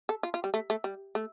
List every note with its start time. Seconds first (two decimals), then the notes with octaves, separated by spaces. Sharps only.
0.09 A4
0.23 F4
0.34 F4
0.44 G3
0.54 A3
0.70 A3
0.84 G3
1.15 A3